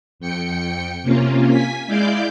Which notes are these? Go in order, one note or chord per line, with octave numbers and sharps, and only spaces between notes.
F2 G5 C#7
C3 A#3 C#4 F4
G#5 B6
G#3 E4 D5 F5 D6 G6